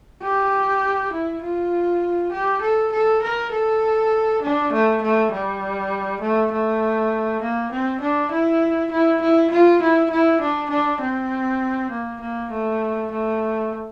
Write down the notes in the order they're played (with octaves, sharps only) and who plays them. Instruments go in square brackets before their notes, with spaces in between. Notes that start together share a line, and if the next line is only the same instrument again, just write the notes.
[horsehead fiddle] G4
E4
F4
G4
A4
A4
A#4
A4
D4
A3
A3
G3
A3
A3
A#3
C4
D4
E4
E4
E4
F4
E4
E4
D4
D4
C4
A#3
A#3
A3
A3